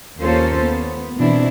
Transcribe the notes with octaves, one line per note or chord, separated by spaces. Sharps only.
D#2 A#3 C#4 F4 A4 C5
B3
B2 E3 C4 D4 E4